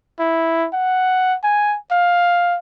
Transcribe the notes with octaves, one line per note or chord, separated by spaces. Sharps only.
E4
F#5
G#5
F5